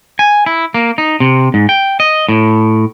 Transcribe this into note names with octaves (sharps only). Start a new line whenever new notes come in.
G#5
E4
A#3
D#4
C3
G#2
G5
D#5
A2